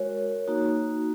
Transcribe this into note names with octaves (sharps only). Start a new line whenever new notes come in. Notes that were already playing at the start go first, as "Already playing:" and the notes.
Already playing: G#3 F#4 A#4 C#5
A#3 D#4 F#4